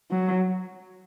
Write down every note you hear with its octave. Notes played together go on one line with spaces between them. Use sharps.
F#3